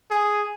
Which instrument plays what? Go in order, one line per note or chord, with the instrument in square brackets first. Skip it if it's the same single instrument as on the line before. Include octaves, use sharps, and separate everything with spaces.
[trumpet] G#4